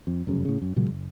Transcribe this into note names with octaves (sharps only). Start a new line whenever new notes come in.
F2
F1 F#2 C#3
A2 C#3
F#2
A#2 C#3 F#3 G#3
F#1